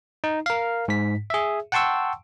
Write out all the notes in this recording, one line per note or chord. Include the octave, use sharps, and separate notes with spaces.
D#4
A#4 F5
G#2 B6
G#4 E5
F#5 G5 A5 C6 C#6 E6